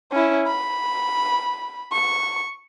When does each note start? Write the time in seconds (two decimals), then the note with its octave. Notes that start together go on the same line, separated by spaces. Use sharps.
0.12 C#4 E4
0.47 B5
1.92 C#6